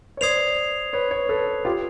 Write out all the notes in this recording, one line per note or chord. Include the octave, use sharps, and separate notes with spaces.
C#5
C5 D5 D#6 G#6 C7 F7
B4 C#5
B4 C#5
A4 B4
F4 G4